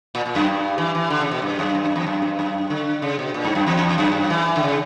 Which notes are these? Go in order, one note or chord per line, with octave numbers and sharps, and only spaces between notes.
A#2
A#2
F#2
G2
E3
E3
D3
C#3
B2
G2
F#2
G2
F#2
E2
F#2
G2
F#2
D3
C#3
B2
A#2
G2
F#2
E2
F#2
E3
D3
C#3